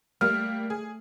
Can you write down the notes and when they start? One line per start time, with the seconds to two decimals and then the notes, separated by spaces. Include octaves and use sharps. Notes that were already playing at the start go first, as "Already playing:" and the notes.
0.21 G3 A3 A#3 F6
0.70 G#4